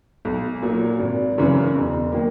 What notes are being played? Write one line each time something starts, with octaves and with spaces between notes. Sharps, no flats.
B1
A#2 F#3
G#1
F#2 C#3 E3
E1
D#3 F#3 A#3